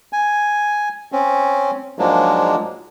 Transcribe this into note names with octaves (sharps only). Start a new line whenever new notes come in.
G#5
C4 C#4
G#2 F3 F#3 G#3 A#3 D4